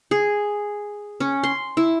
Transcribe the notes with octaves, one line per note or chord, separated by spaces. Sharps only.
G#4
C#4
C6
E4